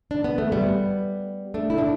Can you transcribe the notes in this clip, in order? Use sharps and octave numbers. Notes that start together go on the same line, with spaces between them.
D4
B3
A3
G3 B3
A3 D4
E4
A3 D4